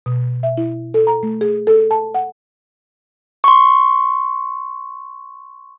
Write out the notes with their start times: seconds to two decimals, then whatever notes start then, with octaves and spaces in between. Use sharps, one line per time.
0.06 B2
0.43 E5
0.58 E4
0.94 A4
1.07 A#5
1.23 A3
1.41 G#4
1.67 A4
1.91 A5
2.15 F#5
3.44 C6 C#6